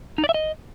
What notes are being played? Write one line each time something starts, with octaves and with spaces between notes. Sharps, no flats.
D#4
D5
E5
D#5